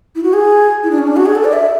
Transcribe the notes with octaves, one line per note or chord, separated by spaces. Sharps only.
E4
F#4
G#4
E4
D4
C#4
D4
F#4
G#4
A4
D5
E5